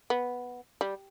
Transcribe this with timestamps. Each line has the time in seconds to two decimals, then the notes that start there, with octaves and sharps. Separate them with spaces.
0.10 B3
0.81 G3